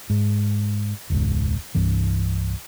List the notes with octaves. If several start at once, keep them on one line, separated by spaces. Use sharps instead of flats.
G#2
E1 C#2 G#2
C2 G2 E3